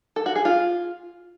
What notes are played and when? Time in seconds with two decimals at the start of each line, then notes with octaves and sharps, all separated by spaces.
0.16 A4
0.26 F#4
0.35 G#4
0.45 F4